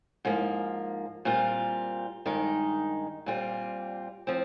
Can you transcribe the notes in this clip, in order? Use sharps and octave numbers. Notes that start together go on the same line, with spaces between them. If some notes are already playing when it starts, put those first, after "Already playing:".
G#2 F3 A#3
A#2 G3 C4 F4
G2 D#3 G#3 D#4
A#2 G3 C4 F4
F3 C4